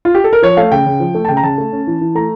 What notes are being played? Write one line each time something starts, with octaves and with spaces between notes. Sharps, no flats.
F4
G4
A4
A#4
F3 C#5
A3 F5
C#3 G5
C#3
F3
A3
A5
C#3 G5
A#5
C#3 A5
A3
C#4
E3
E3
A3 A#5